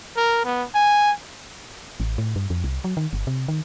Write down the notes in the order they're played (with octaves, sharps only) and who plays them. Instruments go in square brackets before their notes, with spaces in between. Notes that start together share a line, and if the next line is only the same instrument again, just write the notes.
[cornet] A#4
B3
G#5
[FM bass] A1
A2
G2
F2
C2
F#3
D#3
G1
C3
D#3